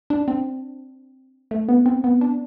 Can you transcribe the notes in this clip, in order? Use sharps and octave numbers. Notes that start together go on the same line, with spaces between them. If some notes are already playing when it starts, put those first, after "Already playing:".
D4
C4
A3
B3
C4
B3
D4